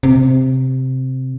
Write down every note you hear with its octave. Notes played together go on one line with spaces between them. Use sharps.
C3